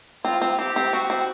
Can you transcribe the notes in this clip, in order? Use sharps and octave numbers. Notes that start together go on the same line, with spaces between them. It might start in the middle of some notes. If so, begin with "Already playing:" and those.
C4 F4
C4
C4 G4
C4
C4 F#4
C4